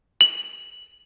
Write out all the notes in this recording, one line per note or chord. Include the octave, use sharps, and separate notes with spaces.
F#7